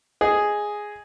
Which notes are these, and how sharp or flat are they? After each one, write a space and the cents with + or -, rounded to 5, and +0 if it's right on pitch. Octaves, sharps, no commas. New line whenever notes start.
G#4 +0 D#5 +0